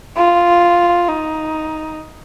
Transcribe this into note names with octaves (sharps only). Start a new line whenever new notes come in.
F4
D#4